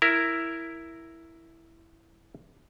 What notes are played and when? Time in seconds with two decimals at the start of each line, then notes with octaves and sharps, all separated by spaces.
0.02 E4 A#4